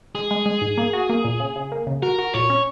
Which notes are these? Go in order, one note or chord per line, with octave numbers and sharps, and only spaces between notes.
G#3 G#4
G#3
G#3
G#2
A#3
F#4
A#3
A#2
C#3
C#3
A#3
C#3
F#4 A#4
F#4
A#2 C#5
C#4